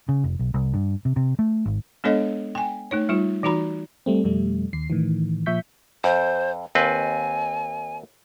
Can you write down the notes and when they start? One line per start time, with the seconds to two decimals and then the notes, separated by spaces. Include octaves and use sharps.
0.09 C#3
0.24 F1
0.39 B1
0.54 C2
0.74 G2
1.05 C3
1.16 C3
1.39 A3
1.65 G#1
2.04 G#3 B3 D4 A4 C#5 D#5
2.55 G5 G#5
2.91 A3 D#4 C#5
3.09 G3 D#4 F4
3.43 E3 D#4 F#4 A#5 B5
4.06 G3 A3 C4
4.24 F2 B2 G3 A3
4.73 D#2 C7
4.90 A2 D#3 E3
5.46 A#2 F3 E5 C#6 G6 B6
6.04 F2 C5
6.75 D#2 C4 B4 G#5